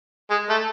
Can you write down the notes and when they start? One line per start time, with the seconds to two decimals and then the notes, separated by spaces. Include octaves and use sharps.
0.30 G#3
0.50 A3